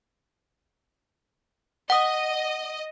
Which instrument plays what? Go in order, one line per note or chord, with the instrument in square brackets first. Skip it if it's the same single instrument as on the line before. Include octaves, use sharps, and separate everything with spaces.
[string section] D#5 [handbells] F#5 D#6